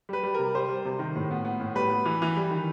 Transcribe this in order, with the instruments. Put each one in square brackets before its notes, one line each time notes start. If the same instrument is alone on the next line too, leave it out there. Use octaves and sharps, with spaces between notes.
[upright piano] G3 B4
G3
C3 A#4
G3 C5
G3
C3
D#3
A2
B3
B3
A2
G3 B4
B3
E3
E3
G3
D#3